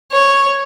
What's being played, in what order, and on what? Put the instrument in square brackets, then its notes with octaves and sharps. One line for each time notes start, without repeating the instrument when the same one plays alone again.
[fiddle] C#5